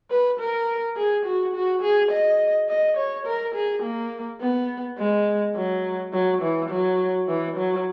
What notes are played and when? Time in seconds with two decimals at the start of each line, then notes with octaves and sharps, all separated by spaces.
0.11 B4
0.39 A#4
0.97 G#4
1.26 F#4
1.55 F#4
1.82 G#4
2.12 D#5
2.69 D#5
2.98 C#5
3.27 A#4
3.55 G#4
3.83 A#3
4.41 B3
4.99 G#3
5.56 F#3
6.14 F#3
6.42 E3
6.70 F#3
7.28 E3
7.57 F#3